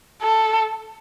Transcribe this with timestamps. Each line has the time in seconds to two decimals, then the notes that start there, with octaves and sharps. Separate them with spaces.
0.22 A4